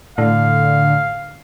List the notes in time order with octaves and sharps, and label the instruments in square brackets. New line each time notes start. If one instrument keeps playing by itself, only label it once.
[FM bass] A2 [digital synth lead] D3 [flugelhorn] F5